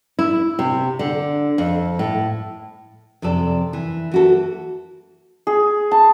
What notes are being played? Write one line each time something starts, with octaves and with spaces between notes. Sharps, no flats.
E4
C3
D3
F2
A2
F2 C3 C4 A4 D5
E3
E3 F#4 A4
G#4
A5